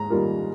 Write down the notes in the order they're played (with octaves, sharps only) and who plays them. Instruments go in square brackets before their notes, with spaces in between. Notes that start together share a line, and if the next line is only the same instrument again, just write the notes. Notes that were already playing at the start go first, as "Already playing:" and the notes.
Already playing: [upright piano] G#2 [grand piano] A#5
[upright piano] D#3 G3 A#3 F4